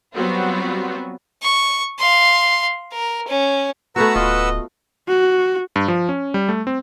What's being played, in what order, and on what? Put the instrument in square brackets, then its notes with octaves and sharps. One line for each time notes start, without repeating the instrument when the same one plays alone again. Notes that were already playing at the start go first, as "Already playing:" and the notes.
[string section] F#3 G3 B3 C4 F4 F#4
[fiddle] C#6
F5 C6
A#4
C#4
[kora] A3 B3 F#4 [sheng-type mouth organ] B4 F#5 E6 [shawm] A#5
[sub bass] D1 [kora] F4 F#4 [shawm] D#5
[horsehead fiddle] F#4
[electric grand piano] G2
F3
C#4
G3
A3
C4